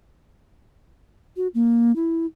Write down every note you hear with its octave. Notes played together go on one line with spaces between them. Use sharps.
F#4
A#3
E4